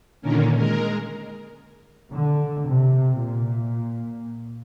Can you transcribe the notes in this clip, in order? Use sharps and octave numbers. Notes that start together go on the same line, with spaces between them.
A#2 D3 D#3 A#3 C#4
G#3 A#4
D3
C3
A#2